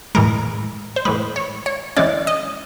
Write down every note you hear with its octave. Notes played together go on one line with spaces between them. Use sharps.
A2 E3 G#3 A#4
C5
A2 E3 G#3 B4
C#5
C#5
E3 G#3 C#4 D5
D#5